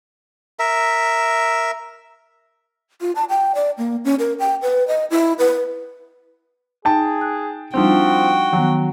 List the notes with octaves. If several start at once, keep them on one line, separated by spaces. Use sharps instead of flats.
A#4 E5
F4
A5
G5
D5
A#3
C#4
A#4
G5
B4
D#5
E4
B4
D#4 G#4 G5 A5
F#6
F3 G3 C4 D4 D#4 F#4 G5
D#3 F3 F#3 B3